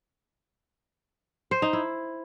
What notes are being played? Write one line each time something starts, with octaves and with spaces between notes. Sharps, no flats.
C5
D#4
E4